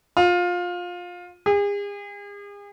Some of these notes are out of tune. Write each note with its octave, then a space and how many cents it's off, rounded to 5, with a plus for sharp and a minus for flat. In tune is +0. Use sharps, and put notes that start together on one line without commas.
F4 +20
G#4 -40